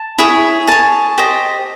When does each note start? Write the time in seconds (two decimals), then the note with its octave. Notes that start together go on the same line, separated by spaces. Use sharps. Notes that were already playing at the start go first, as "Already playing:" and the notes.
Already playing: A5
0.18 E4 G#4 C#5
0.67 G#4 C#5 A5
1.18 G4 C5 D#5